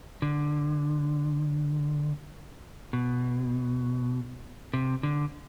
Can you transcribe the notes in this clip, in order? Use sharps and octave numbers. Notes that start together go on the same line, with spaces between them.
D3
B2
C3
D3